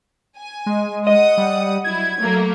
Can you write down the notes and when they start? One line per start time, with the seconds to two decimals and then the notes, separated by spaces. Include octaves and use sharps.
0.37 G#5
0.66 G#3
1.07 D#5 F#5 D#6
1.37 G3
1.84 F#3 E4 G#6
2.18 F#3 A3 A#3